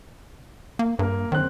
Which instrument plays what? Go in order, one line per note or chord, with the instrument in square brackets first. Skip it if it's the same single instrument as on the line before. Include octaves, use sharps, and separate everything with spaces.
[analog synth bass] A#3
[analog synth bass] G2 [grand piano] A#3 A#4
[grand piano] F#1 C4 F#6 [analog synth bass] D#3